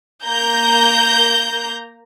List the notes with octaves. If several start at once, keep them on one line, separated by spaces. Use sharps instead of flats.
A#3 A#5 G6